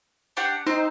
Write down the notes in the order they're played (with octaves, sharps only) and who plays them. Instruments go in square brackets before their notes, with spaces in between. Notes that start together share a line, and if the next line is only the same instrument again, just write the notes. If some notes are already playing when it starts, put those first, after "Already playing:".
[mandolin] D4 G4 F#5
[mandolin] C4 C5 [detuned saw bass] D#4